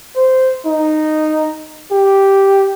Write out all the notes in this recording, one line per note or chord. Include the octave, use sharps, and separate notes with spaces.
C5
D#4
G4